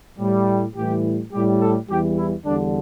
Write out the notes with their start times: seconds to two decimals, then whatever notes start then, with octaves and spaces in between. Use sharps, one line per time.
0.18 A2 G3
0.76 A2 E3 G3 G4
1.32 A2 G3 G4
1.60 A4
1.89 E2 E3 G3 G4
2.16 E4
2.45 E2 D3 G3 D4